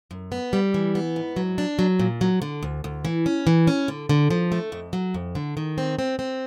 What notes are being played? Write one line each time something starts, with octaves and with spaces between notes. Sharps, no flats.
F#2
B3
G3
E3
B3
G#2
F#3
D4
F#3
A#2
F#3
D3
D2
D2
E3
C#4
E3
C#4
D3
D3
F3
A3
F2
F#3
F2
D3
D#3
C4
C4
C4